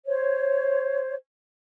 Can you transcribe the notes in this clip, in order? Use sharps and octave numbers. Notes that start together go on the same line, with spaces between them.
C5 C#5